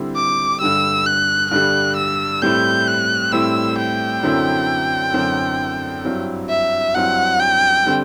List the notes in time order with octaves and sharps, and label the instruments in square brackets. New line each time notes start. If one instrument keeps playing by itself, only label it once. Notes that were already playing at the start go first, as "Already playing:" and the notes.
Already playing: [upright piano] D3 G3 C4 E4
[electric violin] D6
[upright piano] G2 D3 G3 [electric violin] E6
[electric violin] F#6
[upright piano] G2 D3 G3 [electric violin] F#6
[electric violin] E6
[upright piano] A2 G3 C4 E4 [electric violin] G6
[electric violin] F#6
[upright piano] A2 G3 C4 E4 [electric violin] E6
[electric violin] G5
[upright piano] F#2 D3 F#3 C4 E4
F#2 D3 F#3 C4 E4
G2 F#3 C4 E4
[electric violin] E5
[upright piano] G2 F#3 C4 E4 [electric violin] F#5
[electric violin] G5
[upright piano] D3 G3 C4